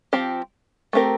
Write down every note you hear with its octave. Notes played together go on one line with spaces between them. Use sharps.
F3 C4 G4
A3 C4 G4 A#4